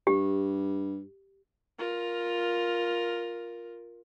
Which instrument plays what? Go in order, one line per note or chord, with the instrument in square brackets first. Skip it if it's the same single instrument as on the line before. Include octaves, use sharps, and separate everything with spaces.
[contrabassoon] G2 [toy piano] G4
[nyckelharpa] F4 A#4